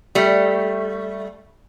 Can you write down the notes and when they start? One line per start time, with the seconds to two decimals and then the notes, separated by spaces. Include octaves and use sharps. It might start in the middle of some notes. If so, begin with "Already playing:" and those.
0.15 G3 A3